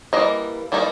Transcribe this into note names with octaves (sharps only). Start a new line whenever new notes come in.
E3 G3 A#3 D#5
E3 G3 A#3 D#4